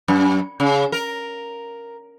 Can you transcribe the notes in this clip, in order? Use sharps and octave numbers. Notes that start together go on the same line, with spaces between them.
F#2
C#3
A#4